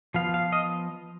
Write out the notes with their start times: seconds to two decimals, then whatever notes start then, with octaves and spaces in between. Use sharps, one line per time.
0.14 F3 B3 F4 F5
0.34 F5
0.53 D#5